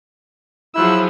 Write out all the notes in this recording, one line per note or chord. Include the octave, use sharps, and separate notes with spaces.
F3 F#3 E4 G#4 E6 F#6